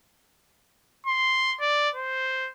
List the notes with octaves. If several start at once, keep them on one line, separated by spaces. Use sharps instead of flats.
C6
D5
C5